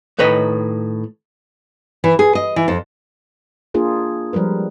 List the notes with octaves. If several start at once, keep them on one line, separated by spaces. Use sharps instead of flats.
A2 D#3 B4 C#5 D#5
E3
G#4
D#5
E3
F2
A#3 D4 F4 G#4 A#4
F3 G3 G#3 A#4 B4